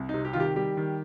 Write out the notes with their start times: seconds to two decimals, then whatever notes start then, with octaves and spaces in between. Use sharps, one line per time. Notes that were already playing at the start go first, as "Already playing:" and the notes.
Already playing: C2
0.09 C3 D#4
0.25 G4
0.33 D#3 F4
0.40 G4
0.56 G3 G4
0.77 D#3